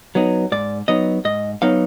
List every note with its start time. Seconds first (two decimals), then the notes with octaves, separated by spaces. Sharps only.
0.15 F#3 B3 D#4
0.52 G#2 D5
0.88 F#3 B3 D#4 D#5
1.25 G#2 D#5
1.62 F#3 B3 D#4 F5